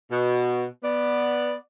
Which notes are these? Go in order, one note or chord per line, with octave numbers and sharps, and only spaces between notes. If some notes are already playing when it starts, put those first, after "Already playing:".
B2
B3 D5